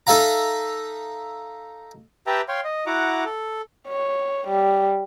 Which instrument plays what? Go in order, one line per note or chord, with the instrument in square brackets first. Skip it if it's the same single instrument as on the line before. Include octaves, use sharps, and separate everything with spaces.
[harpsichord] D#4 A4 E5 F5 A#5
[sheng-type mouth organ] G4 B4 E5 G5 A5 A#5
C#5 F5 G5 C6
D#5
E4 F#4 F#5 A#5 D6
A4
[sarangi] C#5
G3